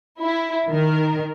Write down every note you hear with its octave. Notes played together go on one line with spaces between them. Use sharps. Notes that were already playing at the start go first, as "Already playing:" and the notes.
E4
D#3 A#4